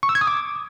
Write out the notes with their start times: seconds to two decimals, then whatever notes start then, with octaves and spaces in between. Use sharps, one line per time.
0.03 C#6
0.09 E6
0.15 G#6
0.21 D#6
0.27 D6